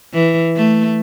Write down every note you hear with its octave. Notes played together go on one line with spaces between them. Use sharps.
E3
A3